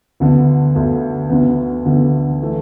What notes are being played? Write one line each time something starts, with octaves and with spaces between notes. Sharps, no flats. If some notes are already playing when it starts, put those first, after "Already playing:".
D2 D3 B3
D2 D3 B3
D2 D3 B3
D2 D3 B3
E3 A3